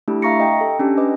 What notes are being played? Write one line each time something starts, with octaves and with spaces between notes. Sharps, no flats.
A3 D4 E4 G4
E5 F5 A#5 C#6 A#6 C#7
D#5 G5
A4
C#4 D4 G4
B4 D#5 D6